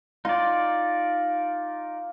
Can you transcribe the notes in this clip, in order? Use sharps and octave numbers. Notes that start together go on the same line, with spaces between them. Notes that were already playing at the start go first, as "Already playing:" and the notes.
D#4 F4 D5